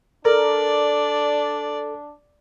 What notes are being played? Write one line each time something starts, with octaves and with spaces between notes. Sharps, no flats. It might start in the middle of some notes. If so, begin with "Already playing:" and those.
D4 A4 A#4 D5